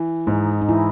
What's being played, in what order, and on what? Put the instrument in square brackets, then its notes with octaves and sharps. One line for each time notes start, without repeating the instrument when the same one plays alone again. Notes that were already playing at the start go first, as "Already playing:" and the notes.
Already playing: [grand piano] E3
[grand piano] G#2 [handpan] D#4
[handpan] D#4
[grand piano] E3 [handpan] E4